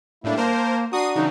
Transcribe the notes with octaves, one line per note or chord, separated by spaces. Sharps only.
A2 G3 A3 A#3 D4 E4
A#3 A#4 C5 A5
D4 F#4 A#5 D#6 C7 D#7
C#3 E3 F#3 D#4